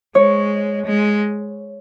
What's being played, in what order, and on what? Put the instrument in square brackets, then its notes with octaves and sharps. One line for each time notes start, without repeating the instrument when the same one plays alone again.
[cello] G#3 [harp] C#5
[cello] G#3